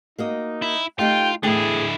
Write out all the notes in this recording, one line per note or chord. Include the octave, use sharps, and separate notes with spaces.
A#3 D#4 F#4 D#5
E4
A3 D#4 F4 G4 G5
E2 D3 A3 E4 G#4 G5